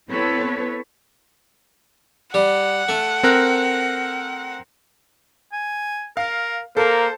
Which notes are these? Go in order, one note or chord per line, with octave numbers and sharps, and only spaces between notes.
B3 C4 E4 A4 B4 C#5
G3 F#5
A3
C4 A#4 F#6
G#5
A#4 F5
A#3 A4 A#4 C5